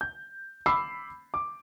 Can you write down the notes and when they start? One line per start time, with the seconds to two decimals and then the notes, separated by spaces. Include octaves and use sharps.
0.01 G6
0.66 B5 D6 E6 C7
1.34 D6